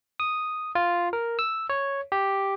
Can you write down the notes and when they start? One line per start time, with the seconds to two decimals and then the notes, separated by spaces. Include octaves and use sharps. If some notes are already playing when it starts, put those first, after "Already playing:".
0.20 D#6
0.75 F4
1.13 A#4
1.39 E6
1.70 C#5
2.12 G4